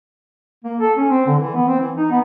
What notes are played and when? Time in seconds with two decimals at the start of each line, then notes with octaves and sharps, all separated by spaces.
0.64 A#3
0.80 A4
0.97 C#4
1.09 C4
1.26 D3
1.39 E3
1.54 B3
1.68 C4
1.80 E3
1.97 D#4
2.11 B3